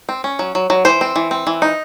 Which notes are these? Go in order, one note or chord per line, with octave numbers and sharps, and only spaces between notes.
C4
C#4
F#3
F#3
F#3
E3 C5
C4
E3
C4
E3
D#4